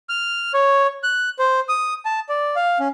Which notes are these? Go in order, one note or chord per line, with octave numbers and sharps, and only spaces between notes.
F6
C#5
F#6
C5
D#6
A5
D5
F5
C#4